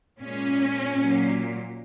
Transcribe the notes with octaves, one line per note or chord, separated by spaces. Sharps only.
A#2 G#3 C#4
A#2 F#3